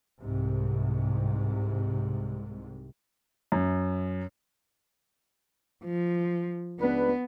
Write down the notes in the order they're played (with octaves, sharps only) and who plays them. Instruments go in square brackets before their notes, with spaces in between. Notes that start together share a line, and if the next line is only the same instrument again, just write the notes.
[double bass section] C2 G#2 C3
[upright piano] F#2
[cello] F3
[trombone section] C#2 D4 B4 [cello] B3